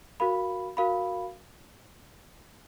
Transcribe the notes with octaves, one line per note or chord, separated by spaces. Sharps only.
F#4 A#4 F5 B5
F#4 A#4 F5 B5